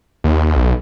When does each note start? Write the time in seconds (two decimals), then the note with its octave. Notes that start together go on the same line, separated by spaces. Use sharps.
0.24 D#2
0.56 B1